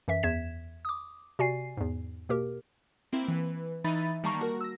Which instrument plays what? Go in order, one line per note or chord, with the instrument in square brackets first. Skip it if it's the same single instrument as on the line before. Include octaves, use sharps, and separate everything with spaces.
[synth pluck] F#2 E3 E5 B6
E2 E5 G#6 B6 E7
D6 D#6
C3 F#4 D5 G#5 C7
E2 G#2
B2 A#3 G4 A#4
[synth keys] A#3 C4 E4
E3 B4
E3 D#4 E5 B5 A6 D#7
D#3 G3 A#3 A5 A#5 C#6
F#4 A#4
E6 A#6